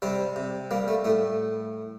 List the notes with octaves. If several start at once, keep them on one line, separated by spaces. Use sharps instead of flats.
C3 G3 C4
C3
G3 A#3
A3
A2 A3